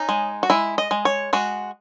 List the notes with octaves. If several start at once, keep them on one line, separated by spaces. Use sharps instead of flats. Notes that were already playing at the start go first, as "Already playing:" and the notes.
Already playing: C#4 D#4
G#3
F#4
G#3 E4
D#5
G#3
C#5
G#3 F#4